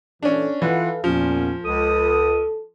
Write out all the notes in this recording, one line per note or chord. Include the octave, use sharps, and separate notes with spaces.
A#2 E3 C#4 D4 A4
E3 F4 A4 B4 F5 F#5
E2 A#2 F3 C#4
C#2 A4 D#6